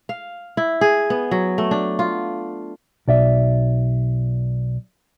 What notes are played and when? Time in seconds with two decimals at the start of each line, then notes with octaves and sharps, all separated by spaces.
0.09 F5
0.57 E4
0.81 G#4
1.10 B3
1.31 F#3
1.58 A3
1.71 D4
1.99 F4
3.08 B1 D5 E5